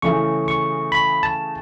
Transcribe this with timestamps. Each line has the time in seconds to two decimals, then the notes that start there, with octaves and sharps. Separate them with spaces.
0.02 C#3 E3 A3 C#4 G#4 C#6
0.48 C#6
0.92 B5
1.23 A5